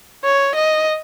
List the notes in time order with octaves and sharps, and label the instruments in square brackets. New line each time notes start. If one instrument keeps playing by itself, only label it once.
[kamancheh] C#5
D#5